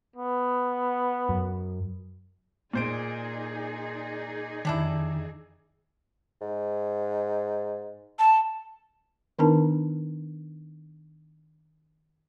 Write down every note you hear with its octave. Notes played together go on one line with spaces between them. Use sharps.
B3
F#2
A#2 D#4 G#4 C5 D5 D7
F2 D#3 G3 D4 E4
G#2
A5
D#3 B3 D4 D#4 A#4 A5